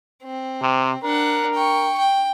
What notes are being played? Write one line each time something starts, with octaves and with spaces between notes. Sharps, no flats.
C4
C3
D4 A#4 F#5
G5 C#6
G5